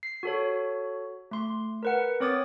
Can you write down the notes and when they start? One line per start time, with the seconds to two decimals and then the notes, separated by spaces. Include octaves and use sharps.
0.03 C7
0.23 F#4 A4 C#5
1.31 A3 C6
1.83 A#4 B4 F#5
2.20 C4 C#5 D6 D#6 A6